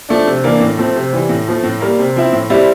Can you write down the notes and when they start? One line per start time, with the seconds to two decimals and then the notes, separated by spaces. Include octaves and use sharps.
0.09 F3 A3 D4
0.27 C3
0.44 E3 A#3 D4
0.60 A2
0.78 F3 A3 C4
0.96 C3
1.13 E3 G3
1.29 A2
1.47 F3 A3
1.64 A2
1.81 G3 A#3
1.99 C3
2.16 F3 C4 E4
2.33 A2
2.50 G3 C4 E4